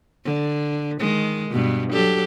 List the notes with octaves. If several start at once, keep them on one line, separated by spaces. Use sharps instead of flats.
D3
D#3 G#3
G2 B2
F#3 G4 A4